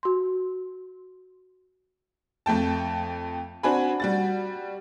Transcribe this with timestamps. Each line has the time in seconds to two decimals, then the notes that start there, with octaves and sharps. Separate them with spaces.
0.03 F#4 C6
2.46 F2 A3 G5 A5
3.63 C4 D4 F#4 G#5 B5
4.00 G3 F#4 A6